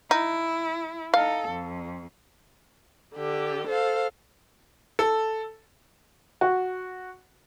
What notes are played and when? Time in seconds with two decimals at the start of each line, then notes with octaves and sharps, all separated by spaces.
0.11 D#4 E4
1.14 D#4 A4 F5
1.49 F2
3.16 D3 G4
3.67 A4 C5 F5
4.99 A4
6.41 F#4